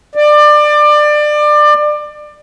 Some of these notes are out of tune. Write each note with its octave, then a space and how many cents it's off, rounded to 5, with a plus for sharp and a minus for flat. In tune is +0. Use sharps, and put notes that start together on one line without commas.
D5 +25